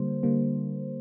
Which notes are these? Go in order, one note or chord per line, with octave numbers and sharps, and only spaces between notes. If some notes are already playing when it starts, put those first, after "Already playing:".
Already playing: D3 G3 A#3 C5
D3 G3 A#3